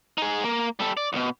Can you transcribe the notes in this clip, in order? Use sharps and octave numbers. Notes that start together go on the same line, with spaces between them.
D#4 G#4
A#3
G3 A4
D5
C2 B2